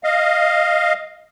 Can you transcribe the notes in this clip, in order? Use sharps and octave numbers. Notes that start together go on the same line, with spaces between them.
D#5 F5